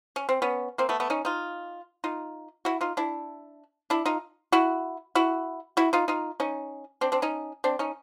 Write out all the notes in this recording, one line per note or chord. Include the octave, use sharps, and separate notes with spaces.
C#4
C4
B3 C#4
A#3 C4
A3 B3
A3 B3
C#4 D#4
D#4 F4
D#4 F4
E4 F#4
D#4 F4
D4 E4
D4 E4
D#4 F4
E4 F#4
E4 F#4
E4 F#4
D#4 F4
D#4 F4
C#4 D#4
C4 D4
C4 D4
C#4 D#4
C4 D4
C#4 D#4